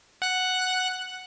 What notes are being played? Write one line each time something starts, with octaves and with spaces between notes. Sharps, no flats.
F#5 F#6